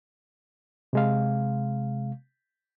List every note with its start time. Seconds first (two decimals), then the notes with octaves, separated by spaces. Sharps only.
0.93 C3 G#3 F5